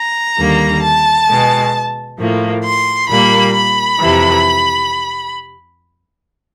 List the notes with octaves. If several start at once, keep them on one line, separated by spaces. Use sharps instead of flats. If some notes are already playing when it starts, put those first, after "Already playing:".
Already playing: A#5
D#2 D3 G3 A#3
A5
B2 G#3
A2 F3 A#3
C6
A#2 G3 A#3 B5
B5
F2 C3 E3